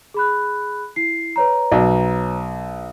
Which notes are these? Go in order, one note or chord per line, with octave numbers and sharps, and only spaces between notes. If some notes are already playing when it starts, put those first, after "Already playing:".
G#4 B5 F#6
E4 C7
B4 C#5 A#5
B1